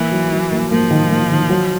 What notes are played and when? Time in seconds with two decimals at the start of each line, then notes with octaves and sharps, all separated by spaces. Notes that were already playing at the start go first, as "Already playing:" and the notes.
Already playing: E3 A#3
0.12 F#3
0.32 F#3
0.52 A#3
0.71 F3 A#3
0.91 D#3
1.10 A#3
1.30 D#3
1.50 F#3